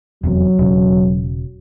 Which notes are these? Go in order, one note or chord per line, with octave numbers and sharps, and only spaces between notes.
F1 E2 C3 F#3
E1 C#3